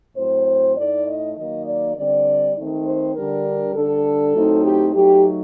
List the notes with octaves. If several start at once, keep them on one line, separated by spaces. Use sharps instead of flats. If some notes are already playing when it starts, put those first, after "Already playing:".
A2 F#3 C4 C5
A2 A3 D#4 D5
D#5
D#3 F#3 A#3 D#5
D5
D3 G3 C4 D5
D#3 A3 C4 D#4
C5
D3 G3 D4 A#4
D3 G3 D4 A4
A2 F#3 A3 C4 D#4
G4
F#3 A3 D#4 G4